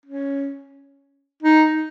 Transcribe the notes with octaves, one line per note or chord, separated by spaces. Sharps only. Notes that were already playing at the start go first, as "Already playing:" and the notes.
C#4
D#4